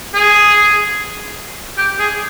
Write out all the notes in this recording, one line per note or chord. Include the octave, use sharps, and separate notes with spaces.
G#4
G4
G#4